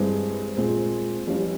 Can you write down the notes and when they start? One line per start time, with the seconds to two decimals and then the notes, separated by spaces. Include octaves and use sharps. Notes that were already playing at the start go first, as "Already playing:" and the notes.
Already playing: G2 E3 G#3 C4
0.57 A#2 G#3 C4
1.27 F2 E3 G3 C#4 F4